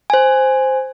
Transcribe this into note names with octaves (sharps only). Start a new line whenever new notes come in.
C5 G#5